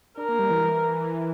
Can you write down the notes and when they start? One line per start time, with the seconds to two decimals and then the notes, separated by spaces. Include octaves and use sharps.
0.17 D4 A#4
0.29 A#3
0.39 G3
0.50 E3